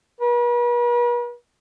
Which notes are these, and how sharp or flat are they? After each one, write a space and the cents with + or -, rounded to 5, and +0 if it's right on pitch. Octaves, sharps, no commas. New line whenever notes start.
B4 -45